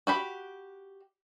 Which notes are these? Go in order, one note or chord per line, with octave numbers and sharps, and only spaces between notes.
F#4 G4 B5